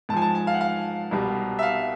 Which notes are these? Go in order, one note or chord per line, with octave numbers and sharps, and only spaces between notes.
G#2 F3 G#5 A5
A5
G#5
F5
F#5
F5
C2 B2 G3
E5
F5